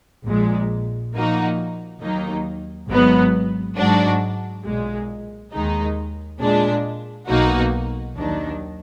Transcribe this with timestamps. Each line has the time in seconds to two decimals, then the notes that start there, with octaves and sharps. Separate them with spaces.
0.25 A#1 A#2 G#3
1.13 A#2 F3 A#3 D#4 F#4
2.01 D#2 D#3 F#3 A#3 D#4
2.88 G#1 G#2 F#3 B3
3.76 G#2 F#3 D4 F#4
4.64 B1 A#2 G#3
5.52 D#2 D#3 G#3 D#4
6.40 A#2 G#3 D4
7.28 B1 B2 A#3 D#4 F#4
8.16 D#2 D#3 F#3 D4